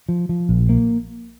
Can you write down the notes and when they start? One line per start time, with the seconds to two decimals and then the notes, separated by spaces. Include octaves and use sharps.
0.09 F3
0.29 F3
0.49 A#1
0.69 A#3